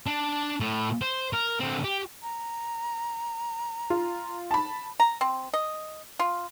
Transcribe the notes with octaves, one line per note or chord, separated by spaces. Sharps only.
D4
A2
C5
A#4
D3 C4
G4
A#5
F4
A5 B5
A#5
C4
D#5
F4